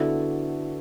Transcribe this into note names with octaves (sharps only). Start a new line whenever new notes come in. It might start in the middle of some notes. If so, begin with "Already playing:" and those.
Already playing: D3 B3 D4 E4 F#4 A4